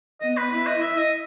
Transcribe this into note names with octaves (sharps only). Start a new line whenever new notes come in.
B3 D#5
B4
E4 B4
D#5
E5
D#5